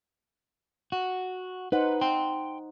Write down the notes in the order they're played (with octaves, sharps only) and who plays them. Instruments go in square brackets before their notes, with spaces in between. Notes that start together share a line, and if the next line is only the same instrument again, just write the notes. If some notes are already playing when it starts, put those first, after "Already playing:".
[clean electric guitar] F#4
[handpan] D#4 C5 F#5 [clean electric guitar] B4
[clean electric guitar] G5 C6